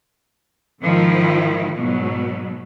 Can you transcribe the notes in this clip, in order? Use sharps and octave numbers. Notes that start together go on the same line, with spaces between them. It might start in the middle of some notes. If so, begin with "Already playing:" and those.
G#2 D#3 F3 E4
G#2 B2 F#3